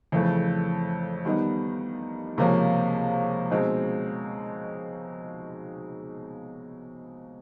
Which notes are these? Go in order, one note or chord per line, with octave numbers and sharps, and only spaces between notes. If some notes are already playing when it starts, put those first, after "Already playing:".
F2 C#3 E3 A3
D#3 G3 B3 D#4
C#2 C3 F3 A#3 C#4
B2 G#3 C4 D#4